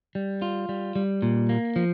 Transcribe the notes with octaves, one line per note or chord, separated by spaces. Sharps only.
G3
F4
G3
G3
A#2
A#3
F3